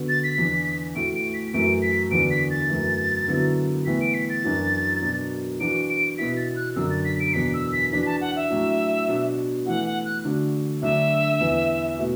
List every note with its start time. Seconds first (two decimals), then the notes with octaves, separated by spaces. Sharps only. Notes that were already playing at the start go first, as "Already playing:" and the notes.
Already playing: D3 B3 F#4
0.09 A6
0.24 B6
0.38 E2 E3 D4
0.95 A2 A3 F#4 D7
1.15 D7
1.34 B6
1.53 F#2 E3 A3 F#4 D7
1.82 B6
2.11 E2 D3 B3 D4 F#4 D7
2.30 B6
2.51 A6
2.70 F#2 E3 A3
3.28 D3 F#3 B3 E4
3.86 A2 E3 B3 E4 B6
4.01 D7
4.14 B6
4.30 A6
4.44 F#2 E3 D4 F#4
5.02 B2 F#3 D4
5.60 E3 D4 F#4 D7
5.89 D7
6.18 B2 B3 E4 B6
6.37 A6
6.56 F#6
6.76 F#2 D3 F#3 D4 F#4 E6
6.90 A6
7.05 B6
7.20 D7
7.34 E2 B2 B3 D4 B6
7.54 E6
7.73 B6
7.92 E3 D4 F#4 B6
8.06 A5
8.21 F#5
8.36 E5
8.50 A2 F#3 D4
9.08 B2 B3 D4 F#4
9.66 E3 A3 E4 F#5
9.86 F#5
10.05 F#6
10.24 D3 A3 D4 F#4
10.82 D3 F#3 A3 D4 F#4 E5
11.40 E2 E3 B3 E4
11.98 B2 A3 F#4